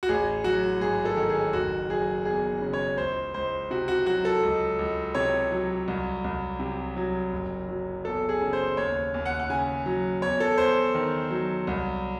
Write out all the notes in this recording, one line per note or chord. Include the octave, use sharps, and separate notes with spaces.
F#4
A1 G#4
F#3 F#4
G#2 G#4
A4
D#3
G#4
F#1 F#4
F#3 G#4
E2 G#4
C#3
C#5
C#2 C5
C#2 C5
C3 F#4
F#4
F#3 F#4
A4
C#2
C#2
C3 C#5
F#3
C2
C2
C3
F#3
F#1
F#3
E2 A4
G#4
C#3
C5
D#2 C#5
D#2
F#5
F#5
C#3 G#5
F#3
E2 C#5
A4
E2 C5
D#3
F#3
C2